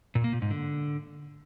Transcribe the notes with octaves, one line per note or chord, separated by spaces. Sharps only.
A#2
A#3
A#2
G#2
D3